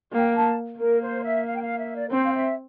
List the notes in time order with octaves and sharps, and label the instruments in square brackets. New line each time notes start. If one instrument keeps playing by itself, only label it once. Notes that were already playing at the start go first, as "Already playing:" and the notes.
[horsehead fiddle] A#3 [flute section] G5
[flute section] A5
[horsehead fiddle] A#3 [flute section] A#4
[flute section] C5
E5
F5
G5
F5
E5
D5
A#4
[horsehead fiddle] C4 [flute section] C5
[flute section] F5
E5